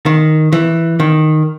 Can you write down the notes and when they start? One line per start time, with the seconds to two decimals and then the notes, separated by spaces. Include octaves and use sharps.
0.06 D#3
0.52 E3
1.00 D#3